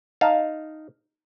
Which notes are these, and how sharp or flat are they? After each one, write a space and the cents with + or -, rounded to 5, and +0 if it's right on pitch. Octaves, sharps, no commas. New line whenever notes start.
D#4 +0 F5 +0 A5 +0